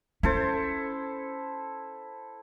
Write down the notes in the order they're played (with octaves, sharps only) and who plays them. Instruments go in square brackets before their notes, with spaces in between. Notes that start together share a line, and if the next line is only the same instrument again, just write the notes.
[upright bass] C#4 [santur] E4 A4 C5